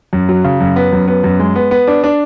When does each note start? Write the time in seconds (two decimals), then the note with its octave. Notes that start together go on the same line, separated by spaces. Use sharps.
0.13 F#2
0.29 F#3
0.44 C#3
0.61 F#2
0.76 B3
0.93 F#2
1.08 B3
1.24 F#2
1.39 G#3
1.56 B3
1.71 B3
1.87 D4
2.04 D4